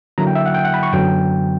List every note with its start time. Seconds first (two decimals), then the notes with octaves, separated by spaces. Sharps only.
0.18 D3 F#3 A#3 E4 A#5
0.27 G5
0.35 E5
0.46 F#5
0.54 G5
0.65 F#5
0.74 B5
0.83 C#6
0.92 F#2 D3 F#3 B3 G5